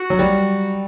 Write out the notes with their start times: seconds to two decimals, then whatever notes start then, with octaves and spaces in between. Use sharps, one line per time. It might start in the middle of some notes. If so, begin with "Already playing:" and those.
Already playing: F#4
0.10 F#3
0.19 G3